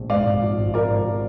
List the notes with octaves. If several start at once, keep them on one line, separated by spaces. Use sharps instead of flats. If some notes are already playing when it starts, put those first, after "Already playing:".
Already playing: A#1
G#2 D5 F5
G#1
F3
G#1
F3 A#4 D5
G#1
F3